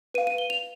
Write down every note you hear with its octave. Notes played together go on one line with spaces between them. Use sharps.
B4 F5 D#7
D#7
G7
F7